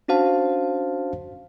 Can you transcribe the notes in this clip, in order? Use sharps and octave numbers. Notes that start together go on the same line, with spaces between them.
C#4 D4 F#4 C5 F5 A5